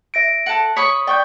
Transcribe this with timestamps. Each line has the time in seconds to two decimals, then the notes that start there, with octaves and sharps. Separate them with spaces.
0.14 E5 A#6 D7
0.46 A4 F#5
0.77 C#5 B5 C#6 D#6 B6
1.07 D5 G5 C#6 G6